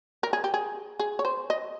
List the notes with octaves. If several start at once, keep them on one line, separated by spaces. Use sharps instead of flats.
A#4
G#4
G4
G#4
G#4
C#5
C5
D#5